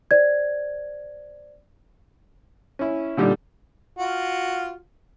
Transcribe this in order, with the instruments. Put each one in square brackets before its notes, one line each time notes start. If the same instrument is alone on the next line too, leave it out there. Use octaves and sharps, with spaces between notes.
[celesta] C5 D5 G#6
[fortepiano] C#4 E4
A#2 D3 G3 D#4 G4
[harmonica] F4 F#4